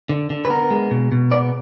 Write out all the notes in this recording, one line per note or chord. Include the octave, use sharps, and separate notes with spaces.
D3
D3
B4
B3 A#4
G#3
B2
B2
B3 D5